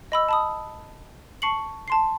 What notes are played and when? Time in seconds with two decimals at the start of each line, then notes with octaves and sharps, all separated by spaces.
0.12 D#5 B5 E6
0.29 A5 B5 D#6
1.42 A5 C#6 C7 C#7 F#7
1.88 A5 C6 C7